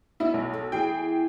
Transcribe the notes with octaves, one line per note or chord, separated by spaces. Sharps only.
B3 E4 D#5 E5
B1
A4
E2 E3 G#4 G5